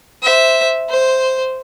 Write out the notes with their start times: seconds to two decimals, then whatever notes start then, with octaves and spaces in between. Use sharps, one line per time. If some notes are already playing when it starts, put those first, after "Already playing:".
0.23 C5 E5
0.89 C5